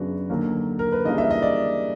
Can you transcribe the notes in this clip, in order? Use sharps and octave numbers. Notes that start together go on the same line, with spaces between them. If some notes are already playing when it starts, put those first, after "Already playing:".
Already playing: F#2 C#3 F#3 B3 D4 F#4
D#2 D3 F#3 A#3
A#4
B4
C#3 E3 G3 A#3 D4 D#5
E5
D#5
D5